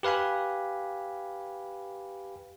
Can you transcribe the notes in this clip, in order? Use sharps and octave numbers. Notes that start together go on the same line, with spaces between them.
G4 B4 F5 G#5 B5